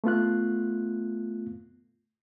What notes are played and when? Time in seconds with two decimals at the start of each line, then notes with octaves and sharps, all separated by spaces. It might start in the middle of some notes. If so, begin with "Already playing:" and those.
0.04 A3 B3 F4 F#6